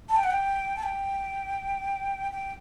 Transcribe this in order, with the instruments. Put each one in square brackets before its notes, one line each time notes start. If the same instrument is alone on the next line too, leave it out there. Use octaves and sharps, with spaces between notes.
[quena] A5
G5
F#5
G5
A5
G5
G5